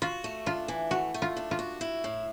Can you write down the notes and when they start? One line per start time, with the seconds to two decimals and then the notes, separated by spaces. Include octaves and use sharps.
0.02 F4 F#4
0.24 A3
0.46 D4 F4
0.68 E3
0.91 A3 F#4
1.14 A3
1.22 F4
1.37 D4
1.51 F4
1.59 F#4
1.81 E4
2.04 A2